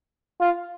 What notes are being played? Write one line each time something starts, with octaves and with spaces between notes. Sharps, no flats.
F4